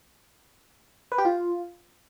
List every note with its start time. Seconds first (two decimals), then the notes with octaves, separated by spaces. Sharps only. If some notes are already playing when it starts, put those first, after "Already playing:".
1.12 B4
1.18 G4
1.25 F4